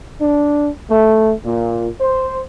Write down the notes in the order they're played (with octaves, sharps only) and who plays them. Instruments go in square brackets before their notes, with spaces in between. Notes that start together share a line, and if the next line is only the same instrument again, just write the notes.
[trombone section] D4
A3
A#2
C5